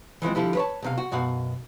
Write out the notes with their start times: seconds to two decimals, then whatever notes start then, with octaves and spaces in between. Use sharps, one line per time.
0.22 E3 F3 G#3 C4
0.35 D3 F3 G3 E4
0.55 B4 C#5 A5
0.82 B1 C3 F5
0.98 F#4
1.11 F#2 B2 F#4 F5 F#5